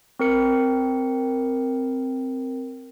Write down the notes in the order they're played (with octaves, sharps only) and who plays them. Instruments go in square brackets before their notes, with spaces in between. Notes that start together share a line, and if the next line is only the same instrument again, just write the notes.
[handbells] C4 A#4 C#7